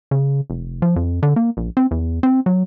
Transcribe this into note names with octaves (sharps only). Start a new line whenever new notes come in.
C#3
F1
F3
F2
D3
A#3
A#1
C4
E2
C4
F#3